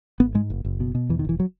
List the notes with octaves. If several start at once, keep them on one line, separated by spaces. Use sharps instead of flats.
G#1 B3
G#2 G#3
F#1
F#1
B2
B2
E2 E3
D#3
E1 E3
F#3